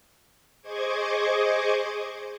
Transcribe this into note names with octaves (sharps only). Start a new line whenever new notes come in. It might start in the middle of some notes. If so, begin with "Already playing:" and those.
G#4 C5 D#5 C#6 D6 G#6